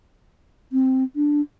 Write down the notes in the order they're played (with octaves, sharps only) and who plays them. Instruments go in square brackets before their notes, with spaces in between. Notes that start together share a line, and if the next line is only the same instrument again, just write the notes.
[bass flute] C4
D4